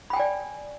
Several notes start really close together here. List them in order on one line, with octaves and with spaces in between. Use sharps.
B5 G5 G#5 D5